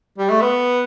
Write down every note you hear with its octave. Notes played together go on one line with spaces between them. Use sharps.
G3
A3
B3